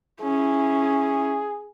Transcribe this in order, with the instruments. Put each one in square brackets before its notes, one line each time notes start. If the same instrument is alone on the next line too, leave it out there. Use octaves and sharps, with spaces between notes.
[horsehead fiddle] C#4 E4 [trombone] G#4